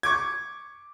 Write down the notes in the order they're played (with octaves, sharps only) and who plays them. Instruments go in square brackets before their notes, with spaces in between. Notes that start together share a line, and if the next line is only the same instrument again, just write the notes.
[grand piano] C#6 D6 G#6